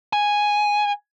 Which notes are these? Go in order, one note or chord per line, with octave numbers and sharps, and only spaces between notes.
G#5